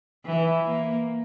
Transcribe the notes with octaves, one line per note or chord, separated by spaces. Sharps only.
E3
A#3